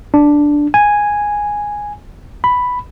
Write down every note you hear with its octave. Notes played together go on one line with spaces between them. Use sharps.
D4
G#5
B5